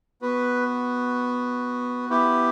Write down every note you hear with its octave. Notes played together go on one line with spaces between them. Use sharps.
B3 F#4 B4
B3 E4 G4